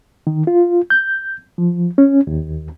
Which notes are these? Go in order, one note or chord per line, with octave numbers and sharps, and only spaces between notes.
D#3
F4
G6
F3
C#4
D#2